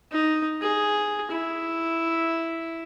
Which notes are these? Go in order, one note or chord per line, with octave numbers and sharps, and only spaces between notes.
D#4
G#4
E4